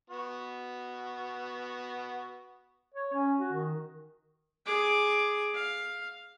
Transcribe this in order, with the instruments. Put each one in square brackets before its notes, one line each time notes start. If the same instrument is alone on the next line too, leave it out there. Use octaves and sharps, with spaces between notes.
[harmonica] B3 F#4
[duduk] C#5
C#4
F#4
D#3
[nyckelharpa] G#4 D6
F5